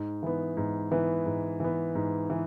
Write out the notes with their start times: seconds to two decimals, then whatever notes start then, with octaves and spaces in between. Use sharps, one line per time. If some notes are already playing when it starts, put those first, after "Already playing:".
Already playing: G#2
0.23 E3 B3
0.57 G#2
0.92 E3 B3
1.26 G#2
1.60 E3 B3
1.95 G#2
2.30 E3